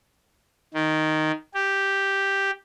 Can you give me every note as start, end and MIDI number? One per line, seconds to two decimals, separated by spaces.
0.74 1.31 51
1.55 2.51 67